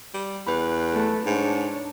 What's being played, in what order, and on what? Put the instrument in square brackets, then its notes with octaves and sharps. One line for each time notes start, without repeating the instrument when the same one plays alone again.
[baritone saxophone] G3
[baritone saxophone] E2 [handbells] B4 B5
[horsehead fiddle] A3
[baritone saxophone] G#2 [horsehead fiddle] D4 C#5